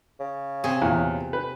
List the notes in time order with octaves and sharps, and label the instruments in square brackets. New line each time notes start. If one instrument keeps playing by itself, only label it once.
[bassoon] C#3
[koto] C3 G#4
[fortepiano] E2 A#2
B4